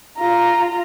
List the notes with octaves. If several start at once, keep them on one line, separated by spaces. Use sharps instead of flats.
F4 A#5